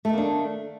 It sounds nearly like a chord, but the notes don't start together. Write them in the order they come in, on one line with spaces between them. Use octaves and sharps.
A3 D#3 A#3 D4